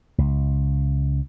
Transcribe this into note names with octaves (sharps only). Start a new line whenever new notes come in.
C#2